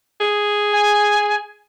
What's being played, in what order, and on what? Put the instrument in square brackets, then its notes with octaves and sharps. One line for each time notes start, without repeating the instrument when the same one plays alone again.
[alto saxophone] G#4
[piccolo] G#5